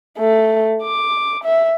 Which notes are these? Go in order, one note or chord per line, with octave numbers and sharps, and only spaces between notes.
A3
D6
E5